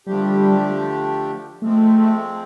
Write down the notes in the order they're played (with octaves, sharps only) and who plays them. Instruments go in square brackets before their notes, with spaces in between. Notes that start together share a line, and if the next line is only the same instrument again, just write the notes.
[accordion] D3 F3 A3 D4 G4 [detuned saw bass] G3
[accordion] F3 G#3 C4 [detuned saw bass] A3